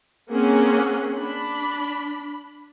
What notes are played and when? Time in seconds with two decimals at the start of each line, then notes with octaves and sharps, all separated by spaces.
0.29 A#3 C4 C#4 G#4 F#5
1.15 D4 B5